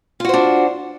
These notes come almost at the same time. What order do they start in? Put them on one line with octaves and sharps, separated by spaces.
F4 F#4 C5 D4